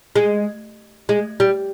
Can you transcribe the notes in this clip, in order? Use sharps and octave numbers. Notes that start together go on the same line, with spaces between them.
G#3
G#3
G3